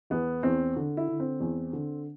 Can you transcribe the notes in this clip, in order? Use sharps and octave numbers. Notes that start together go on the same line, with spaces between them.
E2 B3
E2 C4
D3
E4
D3
C4
E2
D3